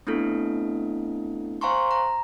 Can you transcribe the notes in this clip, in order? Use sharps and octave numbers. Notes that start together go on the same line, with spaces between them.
A3 B3 C4 D4 E4 A4
C5 F5 G#5 A#5 C6 C#6
A#5